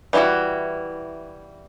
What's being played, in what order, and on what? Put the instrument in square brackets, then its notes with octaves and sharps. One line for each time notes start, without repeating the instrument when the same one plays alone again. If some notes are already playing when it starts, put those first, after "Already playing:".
[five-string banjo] E3 G3 C#4 E4 F#4